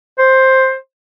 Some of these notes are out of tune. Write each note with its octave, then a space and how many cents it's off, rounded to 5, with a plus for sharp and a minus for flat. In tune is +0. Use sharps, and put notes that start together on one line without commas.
C5 +10